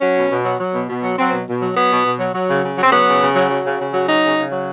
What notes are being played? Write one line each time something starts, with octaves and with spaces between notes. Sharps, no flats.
F#3 C#4
B2
B2
F#3
F#3
B2
B2
F#3
F#3 C4
B2
B2
F#3
F#3 B3
B2
B2
F#3
F#3
C#3
C#3
F#3
C4
F#3 B3
C#3
C#3
F#3
F#3
C#3
C#3
F#3
F#3 D#4
C#3
C#3
F#3